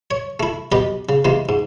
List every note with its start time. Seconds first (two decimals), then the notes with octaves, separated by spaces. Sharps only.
0.11 C#5
0.40 A3 E4
0.72 B1 G4 B4 D#5
1.09 C#3
1.25 C3 E3 G#3 A#3
1.49 G#2